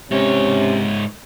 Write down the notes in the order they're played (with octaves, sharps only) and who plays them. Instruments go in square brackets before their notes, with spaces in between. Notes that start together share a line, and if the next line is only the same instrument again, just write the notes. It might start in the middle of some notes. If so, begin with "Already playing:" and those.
[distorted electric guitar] G#2 C#5 [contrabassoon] C3 [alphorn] C#4